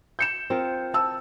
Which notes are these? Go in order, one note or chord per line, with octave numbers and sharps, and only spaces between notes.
G6 C#7 E7
C4 F4 A#4
A5 E6